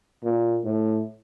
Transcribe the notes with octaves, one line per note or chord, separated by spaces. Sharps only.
A#2
A2